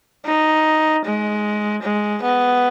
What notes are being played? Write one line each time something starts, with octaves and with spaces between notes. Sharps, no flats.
D#4
G#3
G#3
B3